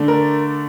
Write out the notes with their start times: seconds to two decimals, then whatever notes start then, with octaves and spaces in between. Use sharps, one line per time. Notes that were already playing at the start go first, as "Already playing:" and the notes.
Already playing: D3 A3 D4
0.08 A#4